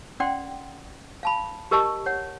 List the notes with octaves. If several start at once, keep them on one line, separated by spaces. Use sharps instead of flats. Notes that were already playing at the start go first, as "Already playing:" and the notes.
C#4 D5 F#5 G5 C6
F5 A5 B5
G4 A#4 D#5 A5 C#6
C#5 F#5